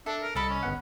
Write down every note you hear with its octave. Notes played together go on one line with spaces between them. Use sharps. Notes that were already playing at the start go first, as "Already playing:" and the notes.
D4 A4 E5
A#4
C2 A4 D#5 B5
C#4
G1 B3 F#5